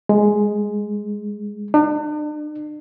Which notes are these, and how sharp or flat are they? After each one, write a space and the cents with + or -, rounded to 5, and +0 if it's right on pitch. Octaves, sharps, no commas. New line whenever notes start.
G#3 +5
D4 +45